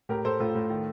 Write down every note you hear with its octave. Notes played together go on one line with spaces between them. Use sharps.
A2 G4 A#4
A2 A4 C5
A2 F4 A4
A2
D#3